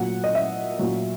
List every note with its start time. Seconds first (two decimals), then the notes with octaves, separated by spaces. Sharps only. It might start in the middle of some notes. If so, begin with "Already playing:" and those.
Already playing: A#2 F#3 F#5
0.24 D#5
0.35 E5
0.79 A#2 F#3